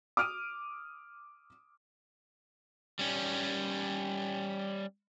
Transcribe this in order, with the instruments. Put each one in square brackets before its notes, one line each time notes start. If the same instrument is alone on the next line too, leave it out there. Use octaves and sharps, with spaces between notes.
[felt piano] D6 D#6 F6 D7 D#7
[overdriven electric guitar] G3 C#4